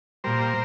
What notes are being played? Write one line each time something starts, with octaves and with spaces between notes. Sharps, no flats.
A#2 G3 A#4 C5